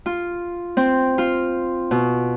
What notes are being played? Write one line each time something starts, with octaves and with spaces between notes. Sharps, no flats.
F4
C4
F4
B2